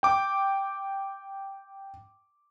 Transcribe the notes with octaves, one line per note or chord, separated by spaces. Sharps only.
G5 D6